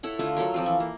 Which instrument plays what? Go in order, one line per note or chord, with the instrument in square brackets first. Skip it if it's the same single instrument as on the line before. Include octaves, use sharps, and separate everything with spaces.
[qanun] E4 A4 C#5 F#5
D3 A3 F4 A5
F#3 A4 A#4 C#5
F3 C4 F4
E3 C#6
A#3